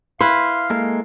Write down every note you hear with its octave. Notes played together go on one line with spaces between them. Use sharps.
E4 B4 F5 C6
G#3 A#3 A4